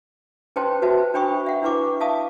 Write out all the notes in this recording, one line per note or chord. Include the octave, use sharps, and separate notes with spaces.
C#4 B4 C5 G5 A5 C6
F#4 B4 C5 E5 A5
D4 C5 G5 B5 C#6 D#6
E5 F#5
D4 E4 B4 C#6 D6
E5 F5 A5 D#6